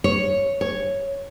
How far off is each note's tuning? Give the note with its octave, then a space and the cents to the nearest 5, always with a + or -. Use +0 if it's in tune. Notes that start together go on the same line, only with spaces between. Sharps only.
C#5 +0
C#5 +0